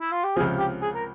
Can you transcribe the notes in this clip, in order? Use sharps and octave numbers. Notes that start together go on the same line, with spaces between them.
E4
F4
G4
C#2 C3 F3 G#4
G4
G#4
A#4